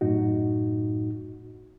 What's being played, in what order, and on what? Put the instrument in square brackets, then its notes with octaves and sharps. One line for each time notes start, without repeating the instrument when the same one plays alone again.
[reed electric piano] F#2 A2 D#4 F#4